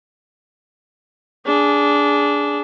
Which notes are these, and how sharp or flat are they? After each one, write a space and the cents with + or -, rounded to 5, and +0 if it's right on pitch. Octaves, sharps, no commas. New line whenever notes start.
D4 -15 G#4 +0